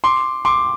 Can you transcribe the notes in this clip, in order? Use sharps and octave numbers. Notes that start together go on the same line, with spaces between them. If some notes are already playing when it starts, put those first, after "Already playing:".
C6 D6
C6 D6